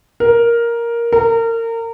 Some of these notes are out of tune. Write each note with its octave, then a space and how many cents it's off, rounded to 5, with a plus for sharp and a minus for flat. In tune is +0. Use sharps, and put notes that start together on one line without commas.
A#4 +5
A#4 -30